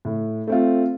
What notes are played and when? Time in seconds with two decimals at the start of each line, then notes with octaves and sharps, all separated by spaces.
0.05 A2
0.47 A3 C4 F4